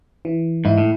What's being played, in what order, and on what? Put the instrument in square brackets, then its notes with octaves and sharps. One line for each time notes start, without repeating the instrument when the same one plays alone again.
[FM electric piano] E3
[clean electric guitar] G#2 [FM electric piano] E4
[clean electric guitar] A2